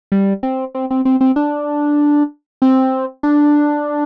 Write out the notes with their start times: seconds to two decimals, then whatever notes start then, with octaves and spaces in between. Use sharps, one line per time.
0.12 G3
0.43 C4
0.75 C4
0.91 C4
1.05 C4
1.21 C4
1.36 D4
2.62 C4
3.23 D4